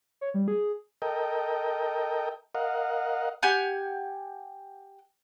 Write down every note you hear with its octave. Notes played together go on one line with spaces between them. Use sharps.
C#5
G3
G#4
A4 A#4 D#5 G5
A#4 D#5 F5 F#5
G4 F#5 G#5 G6